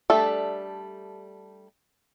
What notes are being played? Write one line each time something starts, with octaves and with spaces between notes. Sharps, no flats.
G3 A3 D4 A4 E5